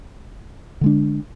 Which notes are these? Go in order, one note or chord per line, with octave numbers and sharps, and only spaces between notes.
D3 G#3 D4